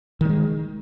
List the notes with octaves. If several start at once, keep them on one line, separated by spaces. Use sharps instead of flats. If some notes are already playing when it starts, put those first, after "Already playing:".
D#3 G3 G#3